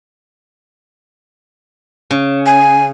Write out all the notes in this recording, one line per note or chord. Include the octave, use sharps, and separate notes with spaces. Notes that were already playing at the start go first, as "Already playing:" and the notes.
C#3
G#5